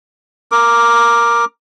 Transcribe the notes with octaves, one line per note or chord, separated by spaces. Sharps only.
A#4 D6